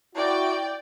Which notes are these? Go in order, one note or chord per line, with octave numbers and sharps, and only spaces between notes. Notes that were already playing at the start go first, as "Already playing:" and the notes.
E4 F#4 D5 G5